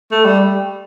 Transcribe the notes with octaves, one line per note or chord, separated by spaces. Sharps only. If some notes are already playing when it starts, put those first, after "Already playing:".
A3
G3